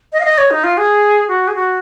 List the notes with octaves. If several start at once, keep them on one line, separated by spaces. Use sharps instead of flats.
D#5
F5
D#5
C#5
D#4
F4
G#4
F#4
G#4
F#4